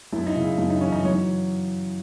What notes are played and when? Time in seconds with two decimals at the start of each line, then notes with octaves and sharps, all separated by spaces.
0.12 F#2 E4
0.27 D#4
0.36 C#3 E4
0.58 F#2 E4
0.70 D#4
0.81 E3 C#4
0.92 D#4
1.04 F#3 C#5